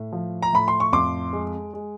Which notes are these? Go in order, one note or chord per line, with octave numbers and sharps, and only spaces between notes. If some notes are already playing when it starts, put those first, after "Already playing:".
Already playing: A2
F3
A#5
A2 B5
C6
C#6
F2 C6 D6
G#3
G#3